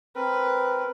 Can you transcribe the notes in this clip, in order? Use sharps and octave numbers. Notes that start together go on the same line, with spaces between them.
C4 A#4 B4